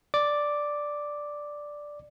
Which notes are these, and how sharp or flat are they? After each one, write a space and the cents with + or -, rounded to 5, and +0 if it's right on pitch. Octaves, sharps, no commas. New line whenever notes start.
D5 +0 D6 +0